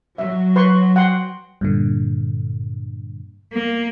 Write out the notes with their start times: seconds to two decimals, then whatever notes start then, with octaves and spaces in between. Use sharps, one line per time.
0.18 F#3 E5
0.56 B4 C6 C#6
0.96 F#5 G5 C6
1.61 G2 A#2 D3
3.53 A#3